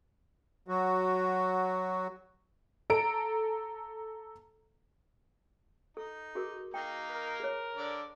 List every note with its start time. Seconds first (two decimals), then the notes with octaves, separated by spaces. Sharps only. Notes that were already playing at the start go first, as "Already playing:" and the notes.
0.68 F#3 F#4
2.90 A4 A#5 D7
5.97 D#4 A4
6.35 F#4 G#4 A#4
6.74 A#3 D#4 G5
7.11 A#4
7.40 G#4 C#5
7.76 D3 D4 D5